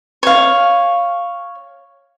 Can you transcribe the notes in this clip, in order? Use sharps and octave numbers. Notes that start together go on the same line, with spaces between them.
C#5 F5